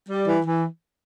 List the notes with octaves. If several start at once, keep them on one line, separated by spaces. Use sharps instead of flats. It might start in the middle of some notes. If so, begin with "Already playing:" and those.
G3
E3
E3